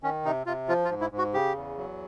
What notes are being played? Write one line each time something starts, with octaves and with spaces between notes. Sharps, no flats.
D#3 C#4
C3 D#4
C3 F4
F3 F4
F4
G#2
E4
G#2
F#4
C#3 G4
E2
F#3